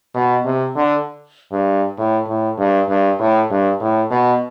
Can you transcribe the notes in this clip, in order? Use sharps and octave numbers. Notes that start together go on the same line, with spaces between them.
B2
C3
D3
G2
A2
A2
G2
G2
A2
G2
A2
B2